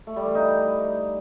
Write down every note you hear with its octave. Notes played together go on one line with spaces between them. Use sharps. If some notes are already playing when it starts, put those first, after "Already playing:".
A3
G3
E3
D#4